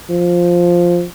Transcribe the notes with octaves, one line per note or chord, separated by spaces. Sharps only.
F3